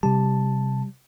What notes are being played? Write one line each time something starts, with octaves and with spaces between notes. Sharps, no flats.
C3 G3 A5